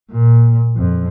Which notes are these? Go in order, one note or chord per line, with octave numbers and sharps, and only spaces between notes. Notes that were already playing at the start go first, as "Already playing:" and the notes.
A#2
F2